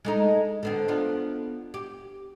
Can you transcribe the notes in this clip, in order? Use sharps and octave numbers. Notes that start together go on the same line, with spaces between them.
G#3 A3 D#4
D3 B3 C4
B3 D4 F4
G4